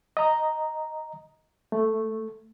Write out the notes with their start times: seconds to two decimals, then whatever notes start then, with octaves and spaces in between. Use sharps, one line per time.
0.17 D#5 A#5
1.72 A3